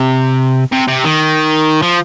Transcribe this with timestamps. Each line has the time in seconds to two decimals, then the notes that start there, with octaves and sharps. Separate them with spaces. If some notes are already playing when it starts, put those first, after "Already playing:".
Already playing: C3
0.72 C3
0.88 C3
1.04 D#3
1.82 F3